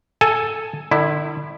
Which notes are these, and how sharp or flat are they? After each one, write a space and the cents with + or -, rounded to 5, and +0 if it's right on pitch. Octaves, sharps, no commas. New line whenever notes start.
A4 +0 G#5 +10
D3 +45 E4 +0